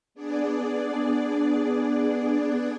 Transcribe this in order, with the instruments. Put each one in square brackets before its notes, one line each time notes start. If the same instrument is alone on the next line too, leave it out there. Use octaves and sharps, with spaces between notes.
[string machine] B3 D4 G#4 D5